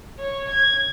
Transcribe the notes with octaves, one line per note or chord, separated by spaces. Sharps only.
C#5
G#6